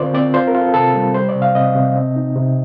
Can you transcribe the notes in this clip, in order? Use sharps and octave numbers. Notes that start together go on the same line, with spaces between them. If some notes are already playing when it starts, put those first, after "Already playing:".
Already playing: D3 C4 F4 A#4 C5 D5
C4 D5
F4 C5
A#4
F4
A4
C3 A4
G3
G3 C5
D5
C3
F5
C3 D#5
C3
C4
D#4
C3